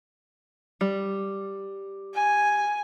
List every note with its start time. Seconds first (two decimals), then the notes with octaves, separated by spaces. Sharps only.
0.81 G3
2.15 G#5